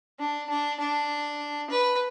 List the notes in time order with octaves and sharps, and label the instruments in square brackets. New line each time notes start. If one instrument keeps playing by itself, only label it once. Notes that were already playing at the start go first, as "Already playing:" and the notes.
[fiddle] D4
D4
D4
B4